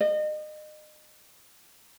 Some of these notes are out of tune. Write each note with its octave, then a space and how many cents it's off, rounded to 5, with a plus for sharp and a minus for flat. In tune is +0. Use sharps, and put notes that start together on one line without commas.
D#5 -30